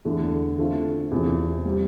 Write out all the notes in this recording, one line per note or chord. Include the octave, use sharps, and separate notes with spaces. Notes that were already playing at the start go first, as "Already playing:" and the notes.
E2 D3 A3
D3 A3 C4 F4
E2 C3 F3
G3 C4 G4